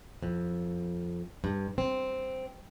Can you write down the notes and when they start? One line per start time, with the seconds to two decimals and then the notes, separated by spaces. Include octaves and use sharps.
0.23 F2
1.44 G2
1.78 C4